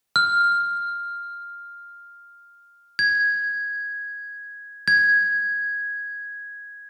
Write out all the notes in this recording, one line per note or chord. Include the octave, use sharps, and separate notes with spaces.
F6
G#6
G#6